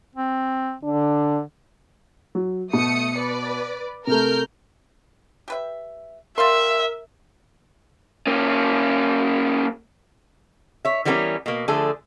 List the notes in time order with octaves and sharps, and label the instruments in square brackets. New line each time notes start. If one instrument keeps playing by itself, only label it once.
[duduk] C4
[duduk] D3 [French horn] D4
[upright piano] F#3
[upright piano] B2 [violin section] A3 D#6 C#7
[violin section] B4 D5
[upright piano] C3 A3 [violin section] A#4 F6 G6
[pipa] G4 B4 E5
[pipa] G3 F5 C6 [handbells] A#4 [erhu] E5
[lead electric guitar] A#3 C#4
[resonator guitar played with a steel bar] C#5 E5
E3 G3 B3 C#4 G4 A#4
B2 A#3
D3 F3 A3 G#4 A4